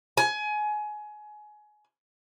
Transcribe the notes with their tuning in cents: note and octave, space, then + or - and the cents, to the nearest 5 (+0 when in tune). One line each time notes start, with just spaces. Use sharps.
G#5 +25